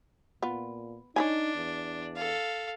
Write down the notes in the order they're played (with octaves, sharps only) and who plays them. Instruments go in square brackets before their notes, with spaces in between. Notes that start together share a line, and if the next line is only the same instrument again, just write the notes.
[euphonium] A#2 [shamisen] B3 F4
[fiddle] D4 [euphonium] D#4 [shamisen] C#5 E5 G#5
[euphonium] E2
[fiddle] A4 F5